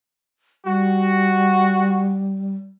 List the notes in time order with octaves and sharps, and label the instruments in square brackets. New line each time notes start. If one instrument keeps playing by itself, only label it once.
[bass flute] G3 [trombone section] F#4